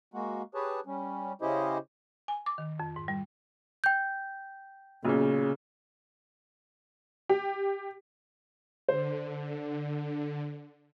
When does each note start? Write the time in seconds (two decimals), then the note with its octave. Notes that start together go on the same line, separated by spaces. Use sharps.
0.14 G#3 A#3 F#4
0.54 G4 G#4 B4 C#5 A5
0.86 G3 C#4
1.41 C#3 C#4 E4 G4 C5 D#5
2.28 G#5
2.46 D6
2.58 D#3
2.80 F2
2.96 G#2
3.08 G3
3.84 G5 G6
5.05 B1 A#2 C#3
7.29 G4
8.89 D3 C5